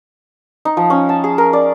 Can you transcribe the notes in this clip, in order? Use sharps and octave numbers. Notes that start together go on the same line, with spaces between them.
D#4
F3
C#4
A5
G#4
A#4
D5